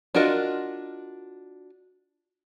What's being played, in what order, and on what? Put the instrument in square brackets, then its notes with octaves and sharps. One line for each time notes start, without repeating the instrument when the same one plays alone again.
[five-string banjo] D4 F4 F#4 A#4 D#5